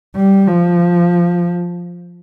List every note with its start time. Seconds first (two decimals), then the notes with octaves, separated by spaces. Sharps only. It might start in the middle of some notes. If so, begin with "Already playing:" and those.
0.16 G3
0.48 F3